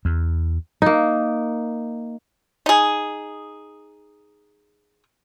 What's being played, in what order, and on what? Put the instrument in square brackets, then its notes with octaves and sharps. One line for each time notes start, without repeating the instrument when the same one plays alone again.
[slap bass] E2
[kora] A#3 D#4
[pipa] D#4 G#4